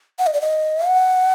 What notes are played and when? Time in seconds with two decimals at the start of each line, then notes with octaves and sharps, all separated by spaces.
0.19 F#5
0.27 D#5
0.33 D5
0.41 D#5
0.87 F#5